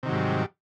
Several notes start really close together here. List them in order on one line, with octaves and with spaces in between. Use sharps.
C3 D#3 F#3 G#2 G3